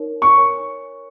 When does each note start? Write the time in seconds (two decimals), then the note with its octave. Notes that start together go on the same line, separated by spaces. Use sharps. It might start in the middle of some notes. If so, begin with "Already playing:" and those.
Already playing: D#4 A#4 C#5
0.22 C#6
0.36 A#4 C#5 G#5